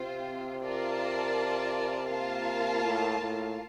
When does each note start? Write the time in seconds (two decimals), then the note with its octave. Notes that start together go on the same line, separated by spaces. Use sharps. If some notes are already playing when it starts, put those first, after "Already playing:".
Already playing: C3 C4 F4 C5
0.65 F4 A#4 D5 A5
2.10 A#3 F4 A#4 F5 A5
2.83 A2
3.20 A2